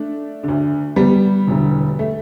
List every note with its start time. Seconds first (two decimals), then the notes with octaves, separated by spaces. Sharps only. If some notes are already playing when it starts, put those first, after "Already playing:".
Already playing: A3 D4
0.44 D2 D3
0.96 G3 B3
1.47 E1 D2 D3
1.99 A3